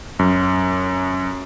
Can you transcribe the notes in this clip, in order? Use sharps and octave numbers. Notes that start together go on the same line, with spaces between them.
F#2